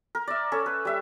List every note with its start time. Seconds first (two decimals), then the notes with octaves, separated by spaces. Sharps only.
0.15 A#4
0.28 D5 E5
0.52 C#4 A4
0.66 B4
0.85 G3 E5